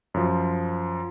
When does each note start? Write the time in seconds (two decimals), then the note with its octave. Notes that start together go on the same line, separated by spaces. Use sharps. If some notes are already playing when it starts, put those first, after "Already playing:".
0.14 F#2 F3